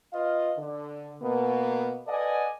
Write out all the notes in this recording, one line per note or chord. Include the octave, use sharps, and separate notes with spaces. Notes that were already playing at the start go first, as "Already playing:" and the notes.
F4 B4 D#5 F5
D3
B2 A#3 B3
A4 B4 D5 D#5 F#5 G#5